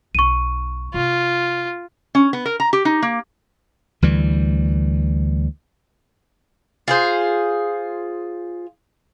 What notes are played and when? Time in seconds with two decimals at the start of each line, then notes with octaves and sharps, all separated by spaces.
0.15 B1 D#4 C#6 D#7
0.94 C3 F4
2.15 C#4
2.33 B3
2.46 A#4
2.60 A#5
2.73 G4
2.85 D#4
3.02 A#3
4.02 D2 E3 G3
6.88 F4 G#4 C5